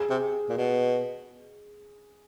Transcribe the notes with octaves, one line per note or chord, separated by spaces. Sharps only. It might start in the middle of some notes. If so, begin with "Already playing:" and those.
Already playing: G#4
C3
A#2
B2